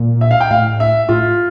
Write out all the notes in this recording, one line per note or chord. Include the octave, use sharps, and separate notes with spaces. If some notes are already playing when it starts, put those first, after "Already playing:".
Already playing: A#2
E5
F5
G5
A2 F5
E5
A2 F4